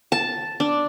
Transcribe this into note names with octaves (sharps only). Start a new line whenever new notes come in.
A5
D4